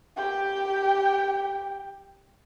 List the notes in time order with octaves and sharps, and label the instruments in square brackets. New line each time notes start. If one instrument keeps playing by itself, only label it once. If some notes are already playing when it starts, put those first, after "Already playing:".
[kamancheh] G4 G5